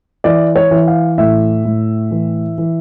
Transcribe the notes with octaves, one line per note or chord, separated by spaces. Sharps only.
E3 D5
C#5
E3
F5
A2 E5
A2
E3
E3